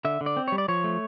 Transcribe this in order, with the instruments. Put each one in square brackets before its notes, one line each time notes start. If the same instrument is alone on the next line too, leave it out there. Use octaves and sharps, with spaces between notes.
[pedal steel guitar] D3 E5
D3
D5
C4
G3 C#5
D5
F3 C#5
A3